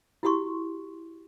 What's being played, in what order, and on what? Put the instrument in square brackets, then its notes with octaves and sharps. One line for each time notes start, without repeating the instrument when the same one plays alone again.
[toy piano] E4 F#4 G4 C6 C#6